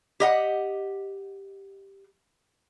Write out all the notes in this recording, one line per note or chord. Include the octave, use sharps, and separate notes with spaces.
G4 D#5 F#5